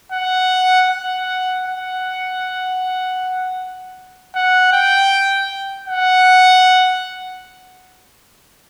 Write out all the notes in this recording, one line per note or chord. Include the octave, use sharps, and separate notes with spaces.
F#5
F#5
F#5
F#5
G5
F#5